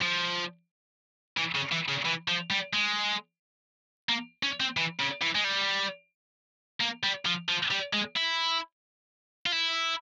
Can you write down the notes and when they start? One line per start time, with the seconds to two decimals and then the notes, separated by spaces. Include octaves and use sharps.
0.02 F3
1.37 E3
1.55 C#3
1.72 E3
1.88 C#3
2.05 E3
2.28 F3
2.51 G3
2.73 G#3
4.09 A#3
4.43 C#4
4.60 C4
4.77 E3
5.00 C#3
5.22 E3
5.35 G#3
5.44 G3
6.80 A#3
7.03 G3
7.26 F3
7.49 F3
7.71 G3
7.93 G#3
8.16 E4
9.46 F4
9.52 E4